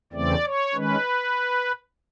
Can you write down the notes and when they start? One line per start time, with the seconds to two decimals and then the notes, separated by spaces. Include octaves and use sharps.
0.13 E2 C#3 E3 A3 C4 D5
0.44 C#5
0.74 D#3 G#3 C#4 B4